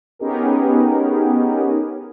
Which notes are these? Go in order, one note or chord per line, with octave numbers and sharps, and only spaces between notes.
B3 C#4 D#4 G4 G#4 A#4